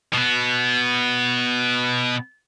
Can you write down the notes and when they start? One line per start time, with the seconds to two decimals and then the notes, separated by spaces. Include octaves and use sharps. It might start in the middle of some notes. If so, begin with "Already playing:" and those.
0.14 B2 B3